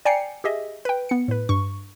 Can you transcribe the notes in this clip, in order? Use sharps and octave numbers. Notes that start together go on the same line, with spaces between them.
D5 G5 G#5 A#5 C7 C#7
G4 G#4 D#5 E5
B4 G5
B3 C#7
A2 B4
G2 C#6